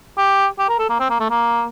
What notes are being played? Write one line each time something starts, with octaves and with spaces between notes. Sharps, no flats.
G4
G4
A#4
A4
A#3
C4
A#3
A3
A#3